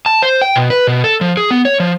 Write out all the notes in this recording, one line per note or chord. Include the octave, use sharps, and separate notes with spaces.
A5
C5
G5
B2
B4
B2
A4
F3
G#4
B3
C#5
F3